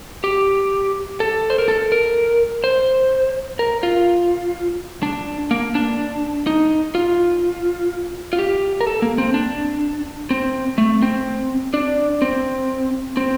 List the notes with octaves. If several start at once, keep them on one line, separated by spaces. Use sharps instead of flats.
G4
A4
C5
A#4
A4
A#4
C5
A#4
F4
D4
A#3
D4
D#4
F4
F4
G4
A#4
A4
A#3
C4
D4
C4
A3
C4
D4
C4
C4